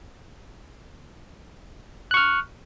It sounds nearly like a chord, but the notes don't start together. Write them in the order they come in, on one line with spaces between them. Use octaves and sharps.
F#6 C#6 F6